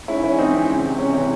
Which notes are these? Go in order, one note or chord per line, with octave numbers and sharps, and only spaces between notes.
G#2 C#4 E4
E3 C#4 E4
G#2 C4 D#4
E3 C4
C#2
C3 E3
C#2 C#4
C3 E3 C#4